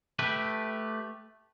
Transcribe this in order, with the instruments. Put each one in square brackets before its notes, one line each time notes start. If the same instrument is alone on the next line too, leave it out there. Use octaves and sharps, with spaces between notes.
[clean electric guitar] A3 G4 B4